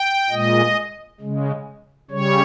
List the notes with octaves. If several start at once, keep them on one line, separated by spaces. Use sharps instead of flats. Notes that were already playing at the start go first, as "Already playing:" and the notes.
Already playing: G5
A#2 G#3 D#5
C#3 G#3
C#3 G3 C#5